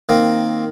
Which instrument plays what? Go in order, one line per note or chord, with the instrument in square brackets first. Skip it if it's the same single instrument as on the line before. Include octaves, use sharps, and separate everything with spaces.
[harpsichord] D#3 A#3 C4